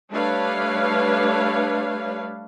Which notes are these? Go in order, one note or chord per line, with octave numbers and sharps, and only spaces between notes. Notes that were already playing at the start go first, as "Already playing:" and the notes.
G3 A3 D4 B4 C#5 F5